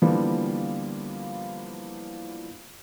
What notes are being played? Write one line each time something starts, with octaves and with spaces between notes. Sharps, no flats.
D3 E3 F3 G3 A#3 B3